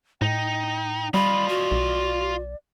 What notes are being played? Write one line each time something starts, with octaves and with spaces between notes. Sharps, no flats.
A2 D#4 G5
G3 F4 D5 D#5 B5
F#4
B1